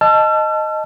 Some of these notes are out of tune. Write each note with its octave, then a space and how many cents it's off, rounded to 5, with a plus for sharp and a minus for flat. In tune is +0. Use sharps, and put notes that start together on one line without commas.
D#5 +0 A5 -5 E6 +45